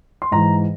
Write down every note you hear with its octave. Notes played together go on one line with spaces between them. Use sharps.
C6
G#2 E3 A#5